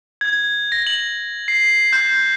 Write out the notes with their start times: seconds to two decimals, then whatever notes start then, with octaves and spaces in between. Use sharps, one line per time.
0.21 G#6
0.72 A#6
0.87 F#7
1.48 C7
1.93 G6